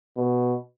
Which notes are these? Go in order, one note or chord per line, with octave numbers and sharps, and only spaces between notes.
B2